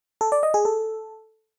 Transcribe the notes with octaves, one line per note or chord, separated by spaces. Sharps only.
A4
D5
D#5
G#4
A4